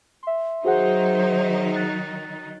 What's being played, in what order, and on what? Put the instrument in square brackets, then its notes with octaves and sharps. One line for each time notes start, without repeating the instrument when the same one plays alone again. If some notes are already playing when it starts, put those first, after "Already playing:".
[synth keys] E5 C6
[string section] D#3 F#3 D#4 [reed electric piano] F#4 G#4 F#5 [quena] C5
[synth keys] F#6 A6